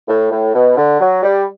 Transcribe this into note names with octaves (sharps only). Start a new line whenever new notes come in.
A2
A2
B2
D3
F#3
G3